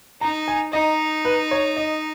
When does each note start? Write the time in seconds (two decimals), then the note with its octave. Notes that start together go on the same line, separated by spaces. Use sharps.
0.21 D#4 A#5
0.48 G#5
0.72 D#4 D#5
1.25 B4
1.51 C#5
1.76 D#5